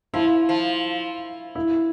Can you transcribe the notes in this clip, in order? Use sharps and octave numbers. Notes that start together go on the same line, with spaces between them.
F3 E4
F3
E4